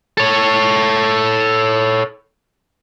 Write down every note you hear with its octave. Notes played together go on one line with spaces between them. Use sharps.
A4 C#5